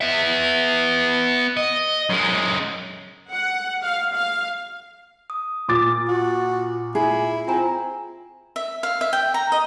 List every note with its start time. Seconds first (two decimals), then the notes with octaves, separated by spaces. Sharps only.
0.01 B3 E5
1.57 D#5
2.09 F#2 G#3
3.31 F#5
3.83 F5
4.14 F5
5.30 D#6
5.68 A#2 D6 A6
6.08 F#4
6.95 E4 G#4
7.47 C4 F4 G#5 A#5
8.56 E5
8.83 F5
9.01 E5
9.13 G5
9.34 A#5
9.52 D#5